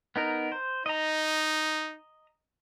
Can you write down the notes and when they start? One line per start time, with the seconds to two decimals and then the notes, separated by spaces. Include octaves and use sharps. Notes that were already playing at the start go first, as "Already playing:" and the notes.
0.16 B3 D#4 A#4
0.52 C5
0.86 D#4 D#5 A#5